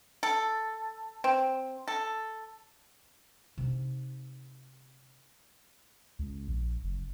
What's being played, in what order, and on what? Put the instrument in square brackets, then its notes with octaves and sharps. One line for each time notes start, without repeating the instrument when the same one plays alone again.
[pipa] A4
C4
A4
[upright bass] C3 D#4
[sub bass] C#2
A#1
F#1